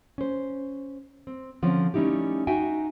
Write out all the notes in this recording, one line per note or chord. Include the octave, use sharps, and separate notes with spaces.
C#4 C5
C4
D3 F3 C4 C#4
G3 A3 C#4 D#4 E4 G4
D#4 F#4 E5 G5 G#5